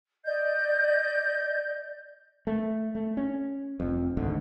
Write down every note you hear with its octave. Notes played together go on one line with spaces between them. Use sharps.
D5 D#5 G6
A3
A3
C#4
F1 F2
G#1 D2 G#2 D3